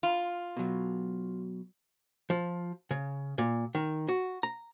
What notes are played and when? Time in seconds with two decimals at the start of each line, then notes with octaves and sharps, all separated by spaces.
0.03 F4
0.57 B2 F#3
2.30 F3
2.91 C#3
3.38 A#2
3.75 D#3
4.08 F#4
4.43 A#5